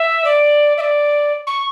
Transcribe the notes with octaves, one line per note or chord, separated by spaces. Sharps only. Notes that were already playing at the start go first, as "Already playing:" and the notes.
Already playing: E5
D5
E5
D5
C#6